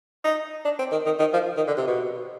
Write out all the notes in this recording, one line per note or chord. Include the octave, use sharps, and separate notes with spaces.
D#4
D4
C4
D#3
D#3
D#3
F3
D#3
D3
C3
B2